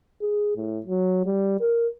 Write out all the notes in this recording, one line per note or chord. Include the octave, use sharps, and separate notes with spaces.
G#4
A2
F#3
G3
A#4